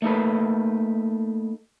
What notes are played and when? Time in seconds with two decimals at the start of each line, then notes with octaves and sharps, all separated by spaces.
0.02 A3 A#3 D#4 F#4 A4 B4